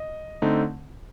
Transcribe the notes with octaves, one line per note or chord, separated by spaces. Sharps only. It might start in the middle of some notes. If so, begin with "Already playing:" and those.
Already playing: D#5
D3 A3 C4 D#4